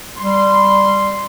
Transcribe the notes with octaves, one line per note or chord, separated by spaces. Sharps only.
G3 C6